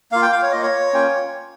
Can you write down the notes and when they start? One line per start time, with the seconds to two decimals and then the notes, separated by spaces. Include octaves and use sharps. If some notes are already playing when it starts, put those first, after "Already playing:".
0.12 A#3 F4 F5
0.22 G5
0.32 F5
0.42 C#5
0.52 A#3 F4 D#5
0.63 C#5
0.93 A#3 C#4 F4 G5